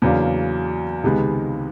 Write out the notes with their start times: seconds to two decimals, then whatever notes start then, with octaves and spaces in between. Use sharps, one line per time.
0.02 E2 C#3 F#3 A#3 D4
1.04 C#2 C3 D#3 G#3 B3